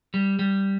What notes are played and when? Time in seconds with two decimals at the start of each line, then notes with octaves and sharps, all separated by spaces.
0.14 G3
0.39 G3